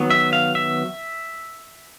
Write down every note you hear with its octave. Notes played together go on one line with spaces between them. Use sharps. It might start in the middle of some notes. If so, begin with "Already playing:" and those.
Already playing: D#3 F#3 B3
E5
F5
E5